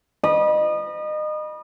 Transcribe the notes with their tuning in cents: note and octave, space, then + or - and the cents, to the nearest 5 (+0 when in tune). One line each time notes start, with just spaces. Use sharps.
D#5 -30 B5 -30